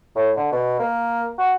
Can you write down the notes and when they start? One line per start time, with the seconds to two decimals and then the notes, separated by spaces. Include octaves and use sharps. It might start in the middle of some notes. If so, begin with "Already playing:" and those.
0.16 A2
0.37 D3
0.52 B2
0.79 A#3
1.38 F#4